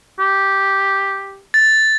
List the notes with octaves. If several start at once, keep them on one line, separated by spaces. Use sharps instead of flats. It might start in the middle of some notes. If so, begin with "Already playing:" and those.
G4
A6